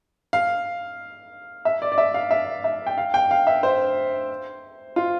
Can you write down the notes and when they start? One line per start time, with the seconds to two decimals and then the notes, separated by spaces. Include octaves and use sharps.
0.33 F5
1.65 E5
1.82 D5
1.92 D5
1.98 E5
2.14 F5
2.31 E5
2.64 E5
2.87 G5
2.98 F5
3.14 G5
3.31 F5
3.47 E5
3.63 C5
4.96 F4